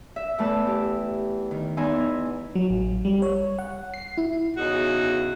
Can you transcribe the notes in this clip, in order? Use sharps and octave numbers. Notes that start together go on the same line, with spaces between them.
E5
E2 E3 A3 B4 A5 E6
G4
D#3
E2 D#4 E4 G#5 C6 E6
F#3
A1
G3
C#5
F#5
C7
E4
E2 C#3 D#4 F#4